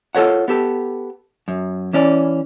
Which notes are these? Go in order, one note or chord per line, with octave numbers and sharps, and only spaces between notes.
F4 A4 A#4 C#5 F#5
B3 G4 A4
F#2
E3 C#4 D5